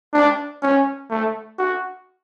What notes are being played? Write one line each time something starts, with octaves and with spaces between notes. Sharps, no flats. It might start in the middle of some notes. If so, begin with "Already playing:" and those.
D4
C#4
A3
F#4